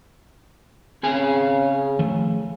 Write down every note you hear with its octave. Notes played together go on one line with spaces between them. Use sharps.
C#3 C4 G#4 G#5
D#3 F3 A3